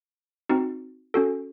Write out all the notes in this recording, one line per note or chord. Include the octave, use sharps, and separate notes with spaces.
C4 D#4 F#4
C#4 F#4 A4